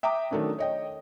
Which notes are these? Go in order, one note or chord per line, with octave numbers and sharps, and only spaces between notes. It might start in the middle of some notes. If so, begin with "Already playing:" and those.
E5 G5 A#5 D6 D#6
D#3 F#3 A3 C#4 D4
C#5 D#5 G5